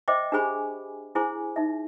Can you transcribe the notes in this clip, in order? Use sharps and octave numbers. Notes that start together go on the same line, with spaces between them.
C5 D#5 E5 G5 D6
D4 G4 G#4 C5 G#5 B5
E4 G#4 C5 G#5 C6
D#4 E5